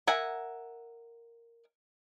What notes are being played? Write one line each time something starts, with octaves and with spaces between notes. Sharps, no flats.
A#4 E5 F#5 G#5